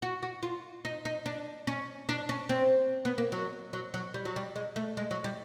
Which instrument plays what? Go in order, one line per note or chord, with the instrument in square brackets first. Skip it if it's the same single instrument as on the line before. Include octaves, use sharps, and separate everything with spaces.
[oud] F#4
F#4
F4
D#4
D#4
D4
C#4
D4
C#4
C4
B3
A#3
F#3
F#3
F#3
G3
F#3
G3
G#3
A3
G#3
F#3
G3